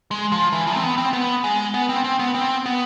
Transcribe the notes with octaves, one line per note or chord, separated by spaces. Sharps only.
G#3
F3
E3
F3
C4
B3
C4
B3
G#3
B3
C4
C4
B3
C4
B3